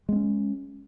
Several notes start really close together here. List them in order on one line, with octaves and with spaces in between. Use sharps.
G#3 B3 C#4